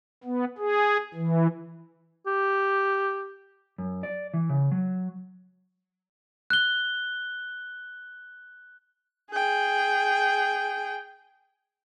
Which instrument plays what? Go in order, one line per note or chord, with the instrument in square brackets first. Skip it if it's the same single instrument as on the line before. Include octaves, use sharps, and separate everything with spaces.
[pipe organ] B3
G#4
E3
[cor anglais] G4
[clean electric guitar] F#2
D5
E3
C#3
F#3
[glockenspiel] F#6 G7
[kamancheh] G#4 G5